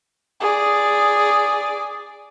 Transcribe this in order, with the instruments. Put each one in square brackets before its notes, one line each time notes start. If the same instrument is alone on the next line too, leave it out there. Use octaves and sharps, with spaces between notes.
[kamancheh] G#4 D5